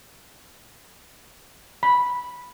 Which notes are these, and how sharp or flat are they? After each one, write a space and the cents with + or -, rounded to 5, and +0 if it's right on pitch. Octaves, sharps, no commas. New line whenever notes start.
B5 -5